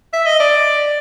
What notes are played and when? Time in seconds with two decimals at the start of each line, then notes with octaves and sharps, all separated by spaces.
0.13 E5
0.26 D#5
0.40 D5